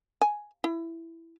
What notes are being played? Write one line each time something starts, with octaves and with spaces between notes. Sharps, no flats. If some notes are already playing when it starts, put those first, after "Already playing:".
G#5
E4